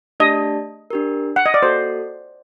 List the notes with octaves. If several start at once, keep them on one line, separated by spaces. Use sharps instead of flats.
A3 D4 G4 D5 D#5 A5
D4 G4 A#4
F#5
D#5
D5
A#3 F#4 A4 C5